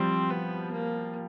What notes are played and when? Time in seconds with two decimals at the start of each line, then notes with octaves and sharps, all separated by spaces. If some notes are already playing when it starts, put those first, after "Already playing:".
Already playing: F3 G3 C4
0.30 B3
0.71 A#3